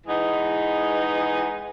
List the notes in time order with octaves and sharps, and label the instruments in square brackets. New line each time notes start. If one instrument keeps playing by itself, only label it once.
[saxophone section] E3 G#3 B3 D#4